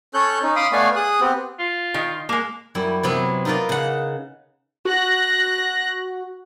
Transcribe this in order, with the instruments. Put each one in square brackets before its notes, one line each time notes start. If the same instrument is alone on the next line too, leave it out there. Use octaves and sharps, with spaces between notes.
[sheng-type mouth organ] C#4 A4 C#5 F#6 G6
C#4 D#4
F5 B5 C6 D6 D#6
A3 B3 C#5 D5 F5 G#5
G#4 D#6 F#6
B3 C4 G4
[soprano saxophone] F4
[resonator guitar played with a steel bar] D#3
G#3 A#3
[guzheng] F#2 G3 E4
C3 F#3 B3 C4
D#4 F4 A#4 B4 D5
C#3 F#5
[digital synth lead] F#4 [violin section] F#6 A#6